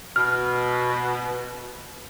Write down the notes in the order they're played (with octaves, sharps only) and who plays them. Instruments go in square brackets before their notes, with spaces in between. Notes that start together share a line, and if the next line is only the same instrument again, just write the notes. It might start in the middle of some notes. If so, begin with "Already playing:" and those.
[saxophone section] B2 [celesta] F6